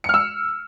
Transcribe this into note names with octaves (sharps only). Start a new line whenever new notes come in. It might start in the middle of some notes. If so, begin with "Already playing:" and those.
E6 F6 C#7